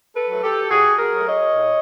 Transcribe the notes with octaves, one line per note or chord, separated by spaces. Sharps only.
A4 B4
F#3 A3
G4 A4
A2 F#4 G#4
G#4 A#4
F#3 A3
C#5 D#5
A2